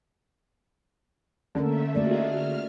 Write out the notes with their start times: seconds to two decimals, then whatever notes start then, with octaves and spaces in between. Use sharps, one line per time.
1.55 D3 A3 A#3 C#4 A4 A#4 E5
1.95 A3 D#4 F4 F#4 G#4 D5
2.24 F6